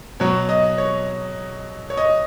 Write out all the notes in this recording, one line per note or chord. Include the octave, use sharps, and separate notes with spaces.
B2 F#3 C#5
D#5
C#5
C#5
D#5